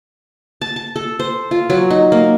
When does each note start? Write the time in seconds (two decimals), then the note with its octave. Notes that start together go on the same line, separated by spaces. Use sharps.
0.61 A5
0.76 A5
0.96 A4
1.19 C5
1.51 F4
1.70 F#3
1.90 D#4
2.12 A#3